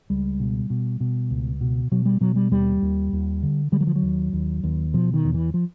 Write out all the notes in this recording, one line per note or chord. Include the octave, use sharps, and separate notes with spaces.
C#2 G3
B2
B2
B2
C#2
B2
B2 F#3
G3
B2 F#3
G3
D#2 G3
D#2
D#2
D3
D3 G3
F#3
F3
F#3
D#2
D#2
D#2
B2 F3
D#3
E2
E3
F3